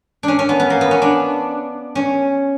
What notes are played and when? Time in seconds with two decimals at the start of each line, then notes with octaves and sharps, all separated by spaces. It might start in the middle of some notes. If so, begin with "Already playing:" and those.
0.23 C#4 D4
0.39 C#4
0.49 B3
0.60 B3
0.70 A#3
0.81 B3
0.91 C#4
1.02 D4
1.95 C#4